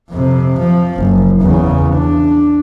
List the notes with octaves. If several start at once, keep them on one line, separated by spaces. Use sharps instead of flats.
F2 C3
F3
F#1
E2 C#3
D4